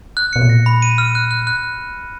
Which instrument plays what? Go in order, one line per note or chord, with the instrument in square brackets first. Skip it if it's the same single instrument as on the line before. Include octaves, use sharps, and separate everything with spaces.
[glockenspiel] F#6
[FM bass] B2 [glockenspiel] C#7
[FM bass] A#2
[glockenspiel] A#6
B5
D#7
F6
F#6
F#6
F#6